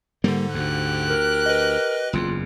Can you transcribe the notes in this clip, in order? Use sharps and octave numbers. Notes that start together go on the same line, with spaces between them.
G#2 D3 G3 A#3
D2 G4 F#6
A#4
B4 D#5
F#1 E2 F4